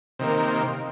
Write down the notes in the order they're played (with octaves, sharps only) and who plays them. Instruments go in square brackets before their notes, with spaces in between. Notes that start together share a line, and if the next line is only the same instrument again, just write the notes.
[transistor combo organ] C3 D#3 A#3